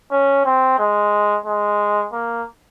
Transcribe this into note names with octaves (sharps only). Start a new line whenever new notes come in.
C#4
C4
G#3
G#3
A#3